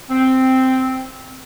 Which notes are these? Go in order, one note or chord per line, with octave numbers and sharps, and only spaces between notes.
C4